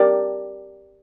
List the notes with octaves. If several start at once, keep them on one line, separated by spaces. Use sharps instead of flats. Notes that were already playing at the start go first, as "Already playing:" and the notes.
Already playing: G4 A#4 D5